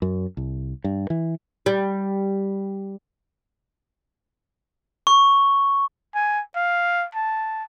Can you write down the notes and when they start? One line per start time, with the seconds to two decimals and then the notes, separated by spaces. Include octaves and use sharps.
0.02 F#2
0.37 C2
0.84 G2
1.10 E3
1.66 G3
5.07 C#6
6.15 G#5
6.56 F5
7.15 A5